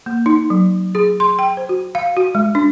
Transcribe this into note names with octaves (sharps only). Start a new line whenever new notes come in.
A#3
D#4
F#3
G#4
C6
G5
C5
F#4
F5
F#4
G#3
D4